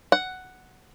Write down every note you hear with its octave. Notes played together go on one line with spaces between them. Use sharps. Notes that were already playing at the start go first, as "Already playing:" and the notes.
F#5